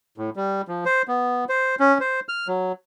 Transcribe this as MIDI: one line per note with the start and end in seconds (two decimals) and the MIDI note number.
0.18 0.30 45
0.36 0.62 55
0.68 0.84 53
0.85 1.02 72
1.08 1.44 59
1.49 1.75 72
1.80 1.98 61
2.00 2.20 72
2.29 2.48 89
2.48 2.72 54